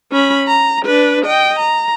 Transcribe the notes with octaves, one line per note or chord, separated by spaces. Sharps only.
C#4 B5
A#5
D4 B4
D#5 G5
A#5